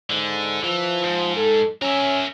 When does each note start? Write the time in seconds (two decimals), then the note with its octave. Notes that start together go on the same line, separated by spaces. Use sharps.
0.10 G#2 D3
0.63 E3 F3
1.04 G#2
1.36 A4
1.82 C#4 A#4 E5